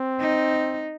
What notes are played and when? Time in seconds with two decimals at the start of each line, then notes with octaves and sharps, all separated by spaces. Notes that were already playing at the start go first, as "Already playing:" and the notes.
Already playing: C4
0.20 D#4